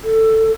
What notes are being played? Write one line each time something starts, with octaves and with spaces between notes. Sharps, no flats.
A4